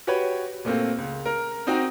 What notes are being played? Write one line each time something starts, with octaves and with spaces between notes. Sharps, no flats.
F#4 G4 B4 C#5
A#2 A3 A#3 C4
C#2
A#4
C4 D#4 F#4 D#5 G5 A#5